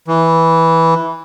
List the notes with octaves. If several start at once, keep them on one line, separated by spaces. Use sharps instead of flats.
E3